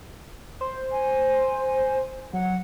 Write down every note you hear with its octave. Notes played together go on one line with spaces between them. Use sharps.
C5
G#5
F#3 F#5